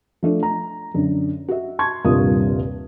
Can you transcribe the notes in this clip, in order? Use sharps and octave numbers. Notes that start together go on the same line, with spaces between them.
F3 A3 D4
A#5
F#2 D3
F#4 E5
A5 C6 C#6 G#6
D#1 G2 C3 A#3 F4 D#6